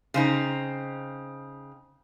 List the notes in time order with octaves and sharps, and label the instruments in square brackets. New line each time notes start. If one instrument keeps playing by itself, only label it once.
[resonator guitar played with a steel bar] C#3 C4 D#4